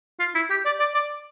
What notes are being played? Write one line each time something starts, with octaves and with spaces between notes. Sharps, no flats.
F4
E4
G4
D5
D5
D5